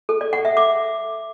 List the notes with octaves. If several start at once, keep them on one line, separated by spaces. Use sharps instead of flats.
A4
D5
F#5
E5
D6